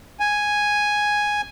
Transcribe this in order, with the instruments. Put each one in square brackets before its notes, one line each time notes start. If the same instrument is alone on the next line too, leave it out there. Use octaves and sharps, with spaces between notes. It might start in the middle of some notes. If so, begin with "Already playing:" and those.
[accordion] G#5